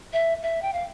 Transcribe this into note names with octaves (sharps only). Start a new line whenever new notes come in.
E5
E5
G5
F5